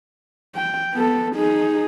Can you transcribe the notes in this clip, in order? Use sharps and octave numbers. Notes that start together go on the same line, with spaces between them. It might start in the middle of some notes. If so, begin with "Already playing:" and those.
G5
B3 A4
D#4 G#4